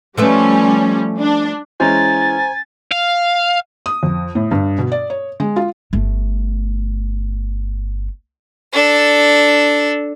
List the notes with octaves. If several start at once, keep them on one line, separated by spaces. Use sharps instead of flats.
F3 G3 A3 C#4 B4
D4
E3 G#3 C#4 C5 G#5 A#5 A6
F5
D#6
F2
A2
G2
B2
D5
C#5
G#3
F4
G1 A3
D4 A4